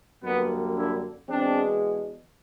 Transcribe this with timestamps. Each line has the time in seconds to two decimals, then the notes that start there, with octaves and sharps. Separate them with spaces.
0.23 F#2 D3 G3 A#3 B3
0.76 D4 E4
1.28 E2 B2 G#3 C4 D4